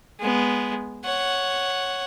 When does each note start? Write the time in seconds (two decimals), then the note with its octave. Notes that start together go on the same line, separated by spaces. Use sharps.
0.20 G#3 B3
1.05 C#5 F#5